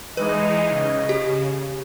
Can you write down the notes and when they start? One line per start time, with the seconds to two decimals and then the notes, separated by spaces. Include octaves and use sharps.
0.17 E3 G#3 D#4 B4 D#5
0.70 C#3
1.09 G4